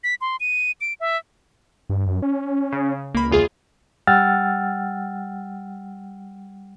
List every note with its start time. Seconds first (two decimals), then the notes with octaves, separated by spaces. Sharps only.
0.04 B6
0.21 C6
0.40 D#7
0.81 D7
1.00 E5
1.90 G2
2.07 F#2
2.22 C#4
2.72 C#3
3.15 C#2 A#3 B5
3.31 E2 F4 G#4
4.07 G3 F#5 G5 E6 F6 A6